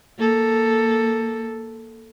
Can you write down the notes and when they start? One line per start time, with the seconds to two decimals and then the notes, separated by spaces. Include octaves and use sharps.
0.18 A#3 A4